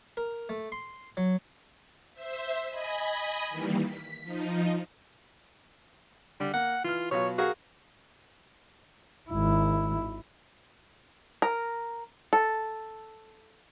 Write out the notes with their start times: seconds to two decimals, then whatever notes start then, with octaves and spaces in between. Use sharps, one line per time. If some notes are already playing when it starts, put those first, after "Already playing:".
0.17 A#4
0.49 A3
0.72 C6
1.17 F#3
2.14 C5 E5
2.69 D#5 G#5 B5
3.50 D#3 E3 G3 A#3
3.84 B6
4.23 F3 D#4
6.40 D3 G3
6.54 A#3 F#5
6.84 E3 F4 F6
7.11 B2 F#3 F4 C#5
7.38 F#4 G#4 A#4 F5
9.30 G#1 E4
11.42 A#4
12.33 A4